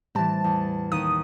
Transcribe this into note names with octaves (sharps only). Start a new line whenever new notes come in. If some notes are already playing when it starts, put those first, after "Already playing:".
A2 E3 G3 C4 A5
E2
D#2 D#6 D#7